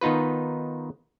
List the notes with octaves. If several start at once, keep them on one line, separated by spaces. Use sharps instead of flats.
D#3 B3 D#4 F4 B4